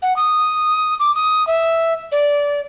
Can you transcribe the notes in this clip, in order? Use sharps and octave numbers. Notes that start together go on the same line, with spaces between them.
F#5
D#6
D6
D#6
E5
D5